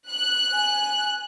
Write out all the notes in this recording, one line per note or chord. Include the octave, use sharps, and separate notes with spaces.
F#6
G#5